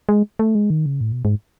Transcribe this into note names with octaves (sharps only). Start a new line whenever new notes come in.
G#3
A3
G#3
D#3
C#3
A2
B2
G#2